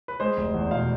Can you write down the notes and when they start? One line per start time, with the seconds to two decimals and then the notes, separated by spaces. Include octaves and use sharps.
0.08 B4
0.20 G#3 C5
0.37 F1
0.54 E2
0.71 B2 F5